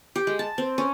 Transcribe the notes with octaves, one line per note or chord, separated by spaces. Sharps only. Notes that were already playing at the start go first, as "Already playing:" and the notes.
G4
G#3
A5
C4
C#4